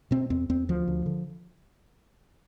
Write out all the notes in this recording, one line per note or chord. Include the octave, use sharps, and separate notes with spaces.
B2 C4
E2 C4
E2 C4
D2 F3
D2
D3